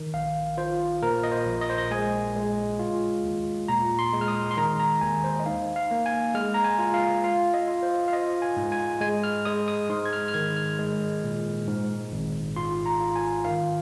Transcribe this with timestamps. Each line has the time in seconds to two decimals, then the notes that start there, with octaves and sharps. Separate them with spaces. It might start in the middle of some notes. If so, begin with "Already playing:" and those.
Already playing: D#3
0.14 A#1 F5
0.57 F4 C5
1.02 A#2 A#4
1.23 D#5
1.31 C5
1.46 A#1
1.61 D#5
1.70 C5
1.78 D#5
1.91 G#3 G#5
2.36 G#3
2.79 F4
3.24 D#2
3.68 A#2 A#5
3.99 C6
4.13 G#3
4.21 F6
4.28 D#6
4.51 C6
4.57 D#3 A#5
4.80 A#5
5.01 D#2 G#5
5.24 C5
5.40 D#5
5.46 D#4 F5
5.76 F5
5.91 A#3
6.06 G#5
6.34 G#3 F6
6.54 A#5
6.64 G#5
6.79 F4
6.94 F5
7.24 F4 F5
7.54 D#5
7.67 F4
7.82 C5
8.08 F5
8.13 F4 D#5
8.42 G#5
8.57 G#2
8.72 G#5
9.01 G#3 G#5
9.23 F6
9.45 G#3 D#6
9.68 D#6
9.90 G#2 C6
10.05 G#6
10.13 F6
10.28 F6
10.34 D#3 G#6
10.56 F6
10.79 G#3
11.24 A#2
11.67 G#2
12.12 G#1
12.56 F4 C6
12.86 A#5
13.00 F4
13.16 G#5
13.45 D#3 F5